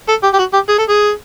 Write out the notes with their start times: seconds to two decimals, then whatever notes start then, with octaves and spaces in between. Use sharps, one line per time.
0.09 A4
0.23 G4
0.34 G4
0.38 F#4
0.53 G4
0.69 G#4
0.79 A4
0.89 G#4